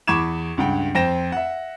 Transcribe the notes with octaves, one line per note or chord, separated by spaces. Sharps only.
E2 B5 C#6 D6 G#6 E7
C#2 G2 F#5 G5
F2 C4 G5 A#6 E7
E5 F#5